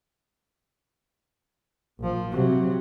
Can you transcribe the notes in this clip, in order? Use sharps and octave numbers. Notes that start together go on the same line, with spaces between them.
A#1 F3
C3 F#3